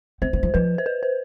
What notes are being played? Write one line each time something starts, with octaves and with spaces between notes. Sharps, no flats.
C4 C5
B3
F3
F3 B4
C5
B4
C5